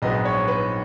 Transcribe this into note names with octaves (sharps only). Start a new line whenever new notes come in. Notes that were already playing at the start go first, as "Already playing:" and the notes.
A#1 G#2 F#3 B3 D#5
C#5
B4